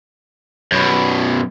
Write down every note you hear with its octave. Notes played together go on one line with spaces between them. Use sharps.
F#2 B2